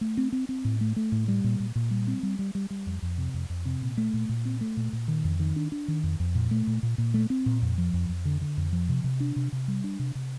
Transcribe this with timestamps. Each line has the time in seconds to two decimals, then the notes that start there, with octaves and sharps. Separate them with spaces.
0.01 A3
0.17 C4
0.32 C4
0.49 C4
0.65 A2
0.81 A3
0.96 A3
1.12 A2
1.28 G3
1.44 A#2
1.60 A#2
1.75 A#2
1.91 G3
2.07 C4
2.23 G3
2.39 G3
2.55 G3
2.70 G3
2.86 F2
3.02 F2
3.18 C3
3.34 F2
3.50 F2
3.65 C3
3.82 A#2
3.97 A3
4.13 A#2
4.29 A#2
4.45 C4
4.61 A3
4.77 A#2
4.93 A#2
5.08 D#3
5.24 F2
5.39 D#3
5.56 D4
5.72 D4
5.88 D#3
6.04 F2
6.20 F2
6.35 A#2
6.51 A3
6.67 A#2
6.83 A#2
6.98 A#2
7.14 A3
7.30 C4
7.46 A#2
7.62 F2
7.78 F3
7.94 F2
8.09 F2
8.25 D3
8.41 D3
8.57 F2
8.72 F3
8.89 C3
9.04 C3
9.20 D4
9.36 C3
9.52 C3
9.68 G3
9.84 D4
9.99 C3
10.15 C3